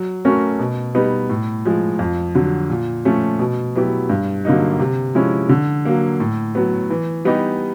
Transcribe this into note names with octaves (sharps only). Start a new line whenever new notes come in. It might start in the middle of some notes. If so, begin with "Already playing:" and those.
Already playing: F#3
A3 C#4 F#4 A#4
B2
G3 B3 D#4
A2
F3 G#3
F2
D3 F#3
A#2
F3 A3 C#4
B2
F#3 B3 E4 G4
G2
D3 F#3 A#3 D#4
C3
F3 G#3 C#4 E4
D3
F#3 A#3
A2
F#3 B3
E3
G3 B3 D#4 G4